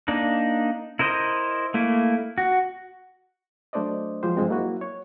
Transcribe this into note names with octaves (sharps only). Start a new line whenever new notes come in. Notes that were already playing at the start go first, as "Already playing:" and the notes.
A#3 D4 D#4
E4 A#4 C5 D#5
A3 A#3 E4
F#4
F#3 A3 D4 C5 D5 D#5
F3 F#3 G#3 G4 C5
G2 F3 G#3 C4
F#3 A#3 E4 F#4
C#5